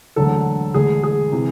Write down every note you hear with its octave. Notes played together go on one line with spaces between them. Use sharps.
E1 D2 D3 F#3 A4
E1 D2 D3 G#4
G#4
C3 E3